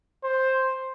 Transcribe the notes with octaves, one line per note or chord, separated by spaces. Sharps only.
C5